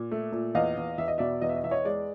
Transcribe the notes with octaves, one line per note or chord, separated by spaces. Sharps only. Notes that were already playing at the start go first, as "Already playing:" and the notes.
Already playing: A#2
A3
A#2
E2 D#5 F5
E2
E2 E5
D#5
B2 D5 E5
E2 D#5
E5
D#5
E2 E5
C#5 D#5
G#3 D5